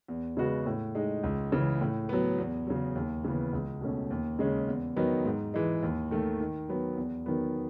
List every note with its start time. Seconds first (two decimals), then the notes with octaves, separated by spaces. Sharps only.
0.08 E2
0.37 C#3 G#3 B3 F#4
0.66 A2
0.95 G#3 D#4
1.23 C#2
1.52 C#3 E3
1.81 A2
2.09 F#3 B3
2.38 E2
2.67 C#3 F#3
2.95 D#2
3.24 C#3 E3 B3
3.53 C#2
3.81 B2 A3 C#4
4.11 D#2
4.39 C#3 G#3 C#4
4.68 E2
4.96 D#3 F#3 B3 D#4
5.25 G#2
5.54 E3 G#3
5.83 D#2
6.11 D#3 A3
6.40 D#3
6.69 F#3 B3
6.97 E2
7.26 D#3 F#3 B3